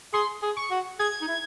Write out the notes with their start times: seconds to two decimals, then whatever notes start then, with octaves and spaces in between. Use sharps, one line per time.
0.14 G#4 C6
0.42 G#4
0.57 C#6
0.71 F#4
0.99 G#4 G#6
1.21 D#4
1.28 E4